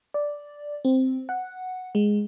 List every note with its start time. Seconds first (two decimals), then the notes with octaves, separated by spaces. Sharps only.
0.14 D5
0.85 C4
1.29 F#5
1.95 G#3